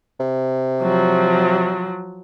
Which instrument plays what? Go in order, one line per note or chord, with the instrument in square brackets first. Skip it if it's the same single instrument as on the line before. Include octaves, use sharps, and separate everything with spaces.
[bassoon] C3
[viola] F3 F#3